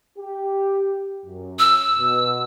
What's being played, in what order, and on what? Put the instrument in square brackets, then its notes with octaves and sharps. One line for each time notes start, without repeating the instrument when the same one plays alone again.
[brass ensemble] G4
F#2
[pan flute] E6
[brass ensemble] B2